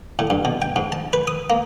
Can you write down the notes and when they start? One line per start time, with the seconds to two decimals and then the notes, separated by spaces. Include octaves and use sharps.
0.19 A2
0.30 G2
0.45 B2
0.62 G5
0.76 G#2
0.92 A5
1.13 B4
1.27 D#6
1.50 A#3